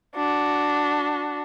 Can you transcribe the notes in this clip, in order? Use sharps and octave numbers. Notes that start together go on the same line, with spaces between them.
D4 F#4